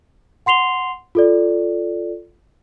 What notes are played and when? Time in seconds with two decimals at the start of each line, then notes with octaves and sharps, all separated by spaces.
0.46 F#5 C6 C7 F7 G7
1.15 F4 A4 D5